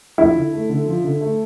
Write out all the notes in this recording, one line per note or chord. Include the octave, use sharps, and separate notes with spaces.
F3 E4
D3
A3
D3
F3
D3
A3